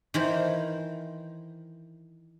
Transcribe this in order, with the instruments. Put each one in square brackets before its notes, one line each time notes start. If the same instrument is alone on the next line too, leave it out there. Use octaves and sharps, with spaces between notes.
[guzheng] D#3 E3 C5